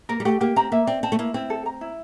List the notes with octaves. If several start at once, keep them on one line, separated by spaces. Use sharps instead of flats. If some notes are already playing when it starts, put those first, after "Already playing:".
A#3 A#4
G3
A3 G4
A#3 G4
C4 A#5
A#3 E5
C4 D5
C4 A5
A3
A#3 E4
C4 E4
A4
A#5
E4